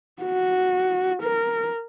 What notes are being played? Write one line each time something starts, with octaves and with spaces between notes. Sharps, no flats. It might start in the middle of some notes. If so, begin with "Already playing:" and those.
F#4
A#4